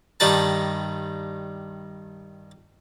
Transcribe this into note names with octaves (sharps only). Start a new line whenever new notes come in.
G2 D#3 G3 D#4 B4 A5